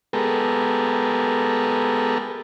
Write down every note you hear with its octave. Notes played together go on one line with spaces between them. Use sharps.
G#3 B3 G4 A4 A#4